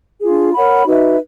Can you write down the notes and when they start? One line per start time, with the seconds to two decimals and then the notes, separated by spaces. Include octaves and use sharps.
0.21 D4 F4 G#4
0.53 A#4 C#5 F#5 B5
0.85 D#4 F#4 B4 E5